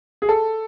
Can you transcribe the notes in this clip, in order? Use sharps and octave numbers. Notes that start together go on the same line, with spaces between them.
G#4
A4